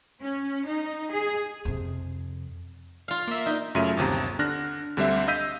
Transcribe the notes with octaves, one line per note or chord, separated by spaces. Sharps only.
C#4
D#4
G#4
F2 C3
F4 F5
A#3 E5
D#4
F#2 C#3 A3 F4 E5 D#7
G1 D#2 C3 A#5
D3 D4 F6 F#6 A#6
D2 D3 G3 C4 C5 E5
D#5 F5 E6 G6 B6 D#7